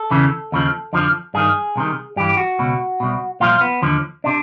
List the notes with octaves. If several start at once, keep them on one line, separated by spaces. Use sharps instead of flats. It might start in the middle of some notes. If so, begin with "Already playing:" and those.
Already playing: A4
E2 C#3 E3
D#2 C#3 F3
F2 D3 F3
G2 D#3 G#4
C2 C3 D#3
G2 E3 G4
F#4
C#2 B2
C2 B2
C2 A#2 F3 F4
B3
D#2 D3 F3
C3 D4